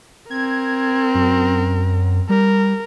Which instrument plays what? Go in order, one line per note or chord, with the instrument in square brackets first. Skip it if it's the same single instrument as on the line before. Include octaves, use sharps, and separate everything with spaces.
[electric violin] C4 A#4 [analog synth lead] G#6
[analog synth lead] F#2
[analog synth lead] G3 [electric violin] A#4